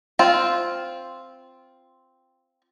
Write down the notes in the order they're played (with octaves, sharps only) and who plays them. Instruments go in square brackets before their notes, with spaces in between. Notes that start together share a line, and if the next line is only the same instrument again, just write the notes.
[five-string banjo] C4 F4